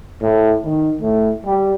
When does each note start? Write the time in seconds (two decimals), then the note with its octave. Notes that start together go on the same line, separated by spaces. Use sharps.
0.22 A2
0.64 D#3
1.02 A2
1.46 G3